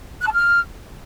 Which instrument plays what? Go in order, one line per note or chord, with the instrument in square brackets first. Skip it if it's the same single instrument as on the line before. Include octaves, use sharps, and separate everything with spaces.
[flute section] F#6
A5
F6